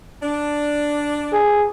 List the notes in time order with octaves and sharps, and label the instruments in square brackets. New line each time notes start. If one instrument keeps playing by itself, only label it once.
[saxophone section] D4
[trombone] G#4